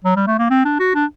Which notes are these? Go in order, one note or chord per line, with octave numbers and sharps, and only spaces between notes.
F#3
G3
A3
A#3
C4
D4
F#4
D4